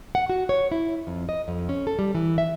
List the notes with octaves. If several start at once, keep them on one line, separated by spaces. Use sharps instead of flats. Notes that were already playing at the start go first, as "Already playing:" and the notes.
F#5
F#4
C#5
E4
F2
D#5
F2
C#4
A4
G3
E3
E5